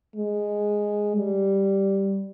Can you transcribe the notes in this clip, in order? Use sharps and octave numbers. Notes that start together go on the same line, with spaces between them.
G#3
G3